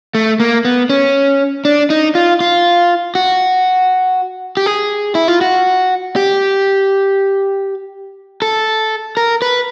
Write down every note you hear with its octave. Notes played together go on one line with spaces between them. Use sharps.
A3
A#3
B3
C#4
D4
D#4
F4
F4
F#4
G4
G#4
E4
F4
F#4
G4
A4
A#4
B4